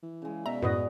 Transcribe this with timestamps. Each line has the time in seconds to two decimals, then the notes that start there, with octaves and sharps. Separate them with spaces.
0.03 E3
0.22 C#3 G#3
0.46 B2 D5 E5 A#5
0.62 F#2 A2 F#4 B4 D#5